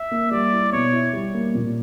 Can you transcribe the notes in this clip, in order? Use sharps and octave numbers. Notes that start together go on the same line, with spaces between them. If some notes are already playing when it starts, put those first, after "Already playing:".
Already playing: E5
A#3
G3 D5
E4
B2 C#5
E4
G3
A#3
A#2